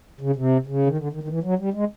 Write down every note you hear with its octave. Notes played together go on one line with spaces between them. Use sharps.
C#3
C3
C#3
D#3
D3
D#3
D#3
E3
F#3
G3
G#3